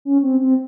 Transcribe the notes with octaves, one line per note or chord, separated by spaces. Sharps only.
C#4
C4
C4